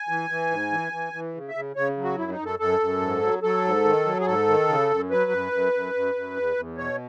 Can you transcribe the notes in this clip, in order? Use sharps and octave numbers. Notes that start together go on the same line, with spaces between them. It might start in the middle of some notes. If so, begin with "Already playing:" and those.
Already playing: G#5
E3
E3
G#2
E3
E3
E3
C#3
E5
C#3
C#3 C#5
F#3
F#4
F#2 E4
D#4
F#2
A4
F#2 A4
F#2
G#2
F#3
F#3 A4
G#2
D#3
F#3
G#4
G#2 A4
D#3
C#3
F#2
F#3 B4
F#2
F#2
F#2
F#2
F#2
E2
E2
B2 C#5